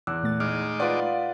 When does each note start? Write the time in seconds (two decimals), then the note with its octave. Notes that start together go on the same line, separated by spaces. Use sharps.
0.07 E2 D6 E6 F#6
0.23 A#2 A3 A6
0.40 G#3 D#4 D6 F6
0.80 F4 B4 D5 F5 F#5